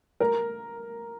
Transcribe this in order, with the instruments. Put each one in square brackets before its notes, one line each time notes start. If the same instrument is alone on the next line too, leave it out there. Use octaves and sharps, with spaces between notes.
[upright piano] A#4